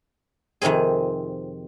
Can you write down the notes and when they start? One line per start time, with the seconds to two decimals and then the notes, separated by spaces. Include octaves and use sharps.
0.62 F2 C3 D#3 C4 G#4